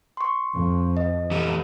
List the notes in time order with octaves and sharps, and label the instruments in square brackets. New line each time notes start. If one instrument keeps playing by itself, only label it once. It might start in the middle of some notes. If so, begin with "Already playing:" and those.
[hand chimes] C6 C#6
[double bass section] F2
[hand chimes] D#5
[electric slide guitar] E3 G4 A4